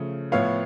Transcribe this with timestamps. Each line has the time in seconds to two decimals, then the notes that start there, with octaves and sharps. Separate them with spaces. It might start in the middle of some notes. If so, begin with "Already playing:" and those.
Already playing: C#3 F3 A3
0.32 A2 F3 B3 C#5 F5